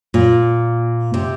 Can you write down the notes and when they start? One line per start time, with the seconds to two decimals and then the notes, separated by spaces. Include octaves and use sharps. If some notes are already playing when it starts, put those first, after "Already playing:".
0.14 A#2
1.14 C3